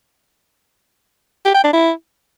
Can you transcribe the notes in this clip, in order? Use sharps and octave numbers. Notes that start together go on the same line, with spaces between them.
G4
G5
D4
E4